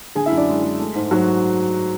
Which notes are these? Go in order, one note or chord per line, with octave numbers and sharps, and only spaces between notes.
D3 G#4 G#5
E4 E5
F#2
D4 D5
G#3
G#3
A3
G#2
G#2 F#3 F#4